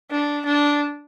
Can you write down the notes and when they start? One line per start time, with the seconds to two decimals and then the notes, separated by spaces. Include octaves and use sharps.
0.11 D4
0.46 D4